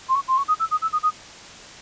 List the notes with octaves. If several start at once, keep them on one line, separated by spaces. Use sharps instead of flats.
C6
C#6
C6
C#6
D#6
E6
D#6
E6
D#6
D#6